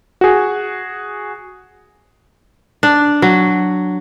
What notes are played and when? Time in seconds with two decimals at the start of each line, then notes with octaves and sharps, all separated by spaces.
0.21 F#4 G#4
2.83 D4
3.22 F#3